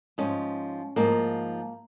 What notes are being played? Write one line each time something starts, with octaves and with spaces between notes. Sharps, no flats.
G#2 F3 C#4
G#2 F3 A#3